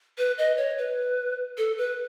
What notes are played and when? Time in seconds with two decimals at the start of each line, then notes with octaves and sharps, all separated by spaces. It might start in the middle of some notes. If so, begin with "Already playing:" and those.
0.18 B4
0.38 D#5
0.57 C#5
0.78 B4
1.58 A4
1.78 B4